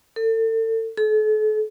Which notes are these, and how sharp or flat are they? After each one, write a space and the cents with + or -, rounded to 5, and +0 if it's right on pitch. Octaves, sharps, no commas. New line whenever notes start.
A4 +35
A4 -40